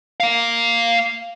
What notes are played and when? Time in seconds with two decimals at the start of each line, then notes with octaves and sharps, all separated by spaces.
0.20 A#3 F5